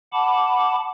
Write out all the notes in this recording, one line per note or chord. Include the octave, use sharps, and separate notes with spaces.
F#5 A5 B5 D6